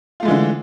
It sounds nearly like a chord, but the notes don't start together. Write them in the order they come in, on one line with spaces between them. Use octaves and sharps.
F4 A3 G#3 E3 D3